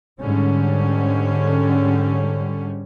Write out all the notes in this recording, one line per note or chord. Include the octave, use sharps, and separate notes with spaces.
G#2 D3 G3 C#4